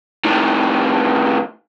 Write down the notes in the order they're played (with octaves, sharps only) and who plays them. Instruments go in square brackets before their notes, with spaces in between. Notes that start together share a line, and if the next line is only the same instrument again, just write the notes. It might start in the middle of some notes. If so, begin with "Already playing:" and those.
[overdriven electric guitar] A2 D#3